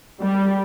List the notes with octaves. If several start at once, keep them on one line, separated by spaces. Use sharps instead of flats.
G3